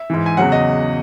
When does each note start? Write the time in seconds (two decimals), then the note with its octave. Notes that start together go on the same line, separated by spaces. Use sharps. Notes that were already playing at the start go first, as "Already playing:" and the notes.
Already playing: E5
0.10 G#2 E3
0.26 G#5
0.37 E2 C#3 F#3 F#5
0.52 D#5